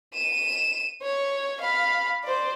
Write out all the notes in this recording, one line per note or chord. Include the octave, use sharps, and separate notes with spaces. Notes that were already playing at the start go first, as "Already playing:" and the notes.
D#7 E7
C#5
F5 B5
C5 D5